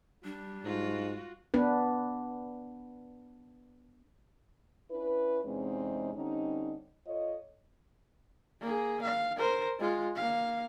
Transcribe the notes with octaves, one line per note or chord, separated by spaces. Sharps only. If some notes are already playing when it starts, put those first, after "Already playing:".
G3 D4
G#2 F4 F#4
B3 D4 B4
C#4 D4 E4 B4
E2 C3 G#3 C4 C#4 D#4
D3 G3 C4 C#4 D#4
F4 A4 C#5 D#5
A#3 G#4
F5
A#4 C5
G#3 F4
A#3 F5